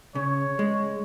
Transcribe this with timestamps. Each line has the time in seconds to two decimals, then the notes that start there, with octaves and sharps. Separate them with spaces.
0.15 C#3 C#5
0.59 G#3